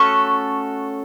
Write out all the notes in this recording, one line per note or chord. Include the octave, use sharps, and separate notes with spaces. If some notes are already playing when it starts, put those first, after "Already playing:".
Already playing: A3 C#4 F#4 A4 C#6